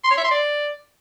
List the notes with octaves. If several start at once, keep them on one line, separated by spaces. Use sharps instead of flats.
C6
C#5
E5
C6
D5